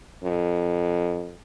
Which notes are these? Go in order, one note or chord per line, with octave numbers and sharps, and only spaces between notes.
F2